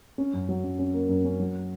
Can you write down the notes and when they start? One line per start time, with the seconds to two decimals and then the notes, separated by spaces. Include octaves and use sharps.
0.18 C#4
0.33 F#2
0.49 F#3
0.64 F#2
0.79 C#4
0.94 A#3
1.09 F#2
1.25 C#4
1.40 F#3